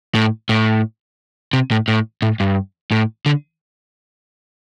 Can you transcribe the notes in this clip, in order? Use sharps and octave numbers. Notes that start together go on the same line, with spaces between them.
A2
A2
C3
A2
A2
A2
G2
A2
D3